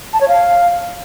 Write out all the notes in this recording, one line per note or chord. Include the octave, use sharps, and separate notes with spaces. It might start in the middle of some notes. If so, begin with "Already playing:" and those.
A5
C#5
F5